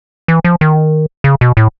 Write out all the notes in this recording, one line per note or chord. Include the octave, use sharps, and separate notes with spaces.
E3
F3
D#3
C#3
B2
A2